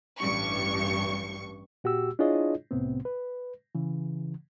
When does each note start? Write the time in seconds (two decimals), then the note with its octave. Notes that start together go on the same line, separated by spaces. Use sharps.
0.19 A1 G2 C#6
1.84 A#2 F#4 G4 E6
2.19 D4 E4 F4 G#4 C#5 D#5
2.71 C2 A2 C3 B3 C4
3.05 B4
3.75 C#3 E3